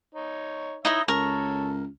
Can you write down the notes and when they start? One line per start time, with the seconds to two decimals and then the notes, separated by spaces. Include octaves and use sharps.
0.15 D#4 C#5
0.85 D#4 E4 C#5 D#5 E5
1.08 C#2 A4 A#4 C#5 C#6